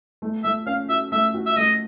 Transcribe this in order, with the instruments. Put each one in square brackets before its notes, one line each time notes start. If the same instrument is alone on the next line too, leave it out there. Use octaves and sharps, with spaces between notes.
[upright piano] A3
[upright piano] A3 [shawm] E5
[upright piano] C#4 [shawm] F5
[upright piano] F#4 [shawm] E5
[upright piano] A3 [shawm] E5
[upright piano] F#4
[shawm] E5
[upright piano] A3 [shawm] D#5